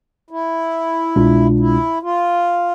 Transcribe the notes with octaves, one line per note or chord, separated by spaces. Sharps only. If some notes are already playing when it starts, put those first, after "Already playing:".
E4
C2 B2 G#3 D4 F4
E4
F4